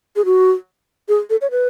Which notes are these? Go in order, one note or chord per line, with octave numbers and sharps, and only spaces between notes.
G#4
F#4
G#4
A4
C#5
B4